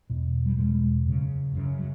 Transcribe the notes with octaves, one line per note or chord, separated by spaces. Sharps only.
E2 B2
G3
E2 B2 G#3
F#2 C#3
F#2 C#3
F#3